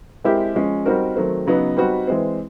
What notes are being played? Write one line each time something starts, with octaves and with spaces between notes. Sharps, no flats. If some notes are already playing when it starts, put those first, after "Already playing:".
G#3 C4 E4 G4 A#4
F3 G#3 C#4
G3 C4 D#4 F#4 A#4
D#3 F#3 A3 C4
C#3 F#3 B3 D#4
G3 C4 D#4 F#4 B4
E3 G#3 C4